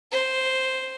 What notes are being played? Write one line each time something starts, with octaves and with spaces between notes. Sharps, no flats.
C5